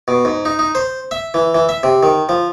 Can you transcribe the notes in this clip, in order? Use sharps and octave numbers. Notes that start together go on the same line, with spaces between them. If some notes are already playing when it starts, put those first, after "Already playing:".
B2
G#2
D#4
D#4
C5
E5
E3
E3
E5
C3
D#3
F3